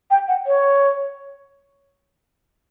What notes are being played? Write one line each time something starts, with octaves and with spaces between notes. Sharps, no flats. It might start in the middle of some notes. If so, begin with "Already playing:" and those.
G5
F#5
C#5